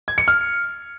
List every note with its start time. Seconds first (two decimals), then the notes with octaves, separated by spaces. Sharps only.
0.08 G#6
0.18 C#7
0.28 F6